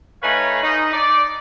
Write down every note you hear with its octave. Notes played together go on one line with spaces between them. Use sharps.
A3 D#4 B4 C#5 F5 G#5
D#4
D5